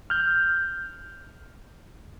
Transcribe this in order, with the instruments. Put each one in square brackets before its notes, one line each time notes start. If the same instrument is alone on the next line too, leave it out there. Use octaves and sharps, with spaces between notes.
[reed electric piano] F6 G6